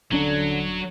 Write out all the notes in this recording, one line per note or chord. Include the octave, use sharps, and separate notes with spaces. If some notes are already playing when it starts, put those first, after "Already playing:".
D#1 D3 F#3 C#4 D4